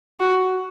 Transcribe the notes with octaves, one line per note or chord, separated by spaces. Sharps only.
F#4